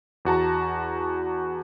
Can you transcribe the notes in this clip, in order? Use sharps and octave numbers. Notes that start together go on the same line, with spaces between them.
E2 F#4 A5 A#5